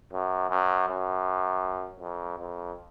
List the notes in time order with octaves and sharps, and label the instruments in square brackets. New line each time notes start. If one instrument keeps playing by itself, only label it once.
[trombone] F#2
F#2
F#2
F2
F2